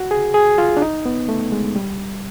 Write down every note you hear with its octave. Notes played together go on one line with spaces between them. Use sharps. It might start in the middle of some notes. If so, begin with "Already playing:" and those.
Already playing: F#4
G#4
G#4
F4
D4
D#4
B3
A3
G#3
G3